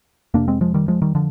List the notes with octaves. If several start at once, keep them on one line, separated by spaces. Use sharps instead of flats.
F2 C3 A#3 D4
G#3 C4
F3 G#3
D#3 G3
F3 G#3
D#3 G3
D3 F3